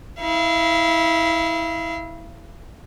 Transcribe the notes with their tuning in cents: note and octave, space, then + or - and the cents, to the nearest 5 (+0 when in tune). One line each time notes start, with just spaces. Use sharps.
E4 -20 F5 -40